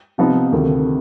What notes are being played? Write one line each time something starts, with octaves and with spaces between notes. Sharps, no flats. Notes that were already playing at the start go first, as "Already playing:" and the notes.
C3 F3 B3 D#4
D2 C3 D#3